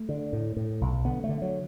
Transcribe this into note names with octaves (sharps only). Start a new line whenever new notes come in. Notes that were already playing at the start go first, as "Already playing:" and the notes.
Already playing: A3
D3
A2
A2
B1
D3 B3
A3
D3
F#3